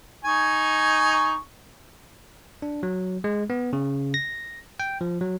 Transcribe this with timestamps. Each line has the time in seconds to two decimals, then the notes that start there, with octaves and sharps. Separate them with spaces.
0.25 D#4 G#5 C#6
2.62 D4
2.83 F#3
3.24 G#3
3.50 B3
3.73 C#3
4.14 A#6
4.80 G5
5.01 F3
5.21 F#3